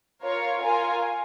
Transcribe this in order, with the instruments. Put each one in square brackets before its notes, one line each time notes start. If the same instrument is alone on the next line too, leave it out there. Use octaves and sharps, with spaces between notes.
[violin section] F4 A#4 C#5 F5
F4 A#4 F5 G#5